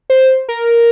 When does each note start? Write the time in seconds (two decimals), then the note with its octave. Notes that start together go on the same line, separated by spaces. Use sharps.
0.10 C5
0.49 A#4